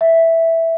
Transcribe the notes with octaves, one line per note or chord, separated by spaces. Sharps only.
E5